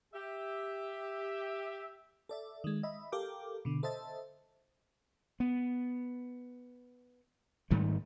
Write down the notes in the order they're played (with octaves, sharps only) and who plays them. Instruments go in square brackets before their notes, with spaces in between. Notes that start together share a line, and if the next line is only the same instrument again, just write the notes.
[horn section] G4 E5
[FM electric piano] A4 D5 E5
D#3 G#3
D#5 E5 B5
G4 A4 A#4 F5 G5 D6
B2 D3
A4 C5 D#5 E5 A5
[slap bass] B3
G#2 D#3 G3 A3